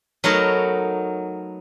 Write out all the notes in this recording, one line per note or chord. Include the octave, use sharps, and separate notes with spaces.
F#3 A3 B3 D#4 A#4 C#5